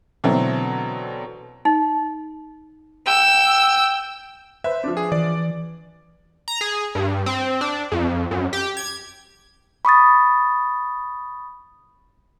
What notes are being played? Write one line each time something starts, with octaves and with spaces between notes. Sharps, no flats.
B2 D3 E3 F#3 A3 C4
D#4
G5 E6
B4 C5 E5
F3 D4
G#4
E3 D5
A#5
G#4
G2
C4
D4
F2
F#2
G4
G#6
B5 C#6 D#6 A6